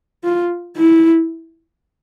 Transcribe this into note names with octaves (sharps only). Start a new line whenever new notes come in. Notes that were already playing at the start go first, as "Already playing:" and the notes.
F4
E4